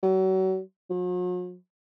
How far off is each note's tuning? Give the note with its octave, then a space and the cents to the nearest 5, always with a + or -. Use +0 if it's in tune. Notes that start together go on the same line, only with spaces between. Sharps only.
F#3 +35
F#3 -45